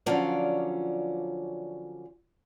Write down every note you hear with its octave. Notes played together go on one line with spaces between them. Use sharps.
D3 F3 F#3 C#4 F4 D5